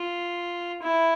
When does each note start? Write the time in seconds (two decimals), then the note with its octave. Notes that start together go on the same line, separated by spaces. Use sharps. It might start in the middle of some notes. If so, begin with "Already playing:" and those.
Already playing: F4
0.82 E4